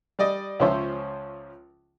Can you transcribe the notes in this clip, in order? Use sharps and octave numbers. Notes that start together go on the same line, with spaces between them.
G3 D5 D#5
C#2 F3 C#4 C5 C#5 E5